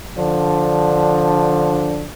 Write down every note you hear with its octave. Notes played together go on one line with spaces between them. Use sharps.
D3 F3 D4